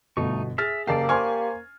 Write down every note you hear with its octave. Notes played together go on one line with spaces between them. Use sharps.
G1 B2 A3 D#4 C#6
G#4 E5 F6 A6
F#1 A#3 G4 D5 A5 D6 C7
C5 G#5 C6 C#6 F6 G#6